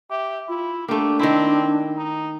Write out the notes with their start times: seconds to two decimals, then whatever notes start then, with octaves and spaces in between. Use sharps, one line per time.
0.10 G4 E5
0.49 E4 F4
0.88 A3 A#3 D4 G4
1.19 D#3 C4 E4
1.97 D#4